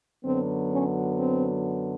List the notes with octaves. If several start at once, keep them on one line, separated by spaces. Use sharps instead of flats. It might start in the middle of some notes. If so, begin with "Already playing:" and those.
F#2 D3 F#3 B3 C4
C#4
C4